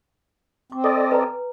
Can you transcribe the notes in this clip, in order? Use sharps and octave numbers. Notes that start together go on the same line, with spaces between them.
C4 D6
A4 D5 D#5
B4 G#5 A#5